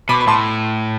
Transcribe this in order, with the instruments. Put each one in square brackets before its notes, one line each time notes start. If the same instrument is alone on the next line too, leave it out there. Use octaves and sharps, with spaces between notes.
[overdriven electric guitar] B2 [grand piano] B5 D6
[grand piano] B5
[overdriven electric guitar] A2 [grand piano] A5 C6